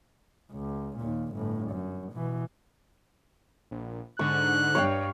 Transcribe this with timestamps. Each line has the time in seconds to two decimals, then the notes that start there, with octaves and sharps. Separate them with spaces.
0.52 C#2
0.97 D#2 A#2
1.33 G1 A2
1.70 F#2
2.13 B2 E3
3.71 A#1
4.19 G#2 D3 C#6 F#6
4.75 G2 C#5 F5 G5